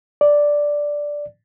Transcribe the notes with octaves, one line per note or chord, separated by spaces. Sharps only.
D5